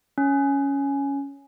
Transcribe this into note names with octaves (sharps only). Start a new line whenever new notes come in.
C#4